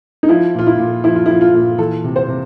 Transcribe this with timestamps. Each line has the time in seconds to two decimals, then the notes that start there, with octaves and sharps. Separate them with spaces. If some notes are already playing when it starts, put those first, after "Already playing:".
0.23 D#4
0.29 F3 E4
0.55 A#2 F4
0.67 E4
0.79 A#2
1.04 F3 E4
1.16 F4
1.26 F3 E4
1.41 F4
1.54 A#2
1.78 E3 A4
2.04 C3
2.16 C5
2.28 C3